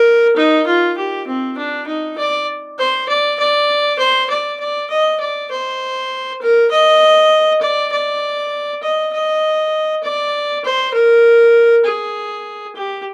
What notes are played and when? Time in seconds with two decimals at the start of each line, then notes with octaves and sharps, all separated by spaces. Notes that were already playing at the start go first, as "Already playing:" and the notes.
Already playing: A#4
0.36 D#4
0.66 F4
0.97 G4
1.27 C4
1.57 D4
1.87 D#4
2.18 D5
2.79 C5
3.08 D5
3.39 D5
3.98 C5
4.30 D5
4.59 D5
4.90 D#5
5.20 D5
5.51 C5
6.41 A#4
6.71 D#5
7.61 D5
7.92 D5
8.82 D#5
9.13 D#5
10.03 D5
10.65 C5
10.94 A#4
11.85 G#4
12.76 G4